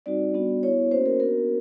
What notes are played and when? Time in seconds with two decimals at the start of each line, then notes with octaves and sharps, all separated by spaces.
0.06 G3 C4 D#4 F#4 D5
0.34 G3 B3 D4 F#4
0.63 B3 E4 C#5
0.91 A#3 C#4 F#4 C5
1.06 A#4
1.20 B3 D4 F#4 A#4